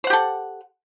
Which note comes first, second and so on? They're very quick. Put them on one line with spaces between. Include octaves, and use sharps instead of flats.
C5 F#5 G4 A4